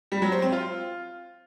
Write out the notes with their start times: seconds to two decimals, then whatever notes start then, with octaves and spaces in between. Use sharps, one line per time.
0.12 G3
0.22 F#3
0.32 C5
0.42 C4
0.52 F4